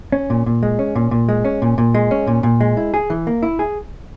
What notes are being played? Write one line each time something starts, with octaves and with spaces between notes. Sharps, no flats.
C#4
A#2
A#2
G#3
C#4
A#2
A#2
G#3
C#4
A#2
A#2
G#3
C#4
A#2
A#2
G#3
E4
G#4
E3
A#3
E4
G#4